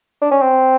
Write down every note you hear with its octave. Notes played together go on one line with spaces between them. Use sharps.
D4
C#4
C4